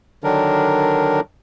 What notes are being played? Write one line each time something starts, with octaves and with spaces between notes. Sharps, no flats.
D3 D#3 F#3 D4 A#4